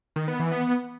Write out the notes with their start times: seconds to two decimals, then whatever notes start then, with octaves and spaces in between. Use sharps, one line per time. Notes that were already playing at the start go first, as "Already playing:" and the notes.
0.16 D#3
0.28 B3
0.40 E3
0.51 B3